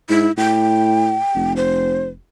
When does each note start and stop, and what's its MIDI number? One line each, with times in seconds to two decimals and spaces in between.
0.10 0.28 44
0.10 0.32 64
0.37 1.18 45
0.37 1.53 79
1.35 2.20 29
1.57 2.07 72